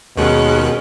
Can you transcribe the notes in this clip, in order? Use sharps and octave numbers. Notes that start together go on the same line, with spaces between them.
D#2 B2 D#3 G#3 C#4 F#6